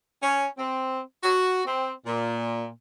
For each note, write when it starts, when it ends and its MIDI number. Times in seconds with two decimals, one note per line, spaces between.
0.21 0.46 61
0.57 1.00 60
1.23 1.61 66
1.65 1.90 60
2.05 2.67 46